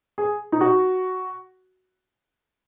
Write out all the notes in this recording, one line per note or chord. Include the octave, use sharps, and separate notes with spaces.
G#4
D#4
F#4